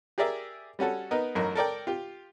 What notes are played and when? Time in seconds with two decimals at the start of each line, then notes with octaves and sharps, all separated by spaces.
0.18 G4 G#4 A#4 D5 E5
0.79 G3 C#4 F#4 A4
1.11 B3 D#4 A#4 B4
1.35 A1 F#2 D#4 A#4
1.55 A4 A#4 D5 G5
1.87 F4 G4